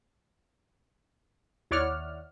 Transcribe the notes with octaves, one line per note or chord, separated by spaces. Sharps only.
D#2 E4 C#5 D5 F#5 F6